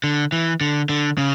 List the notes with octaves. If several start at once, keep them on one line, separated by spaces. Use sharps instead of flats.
D3
E3
D3
D3
C#3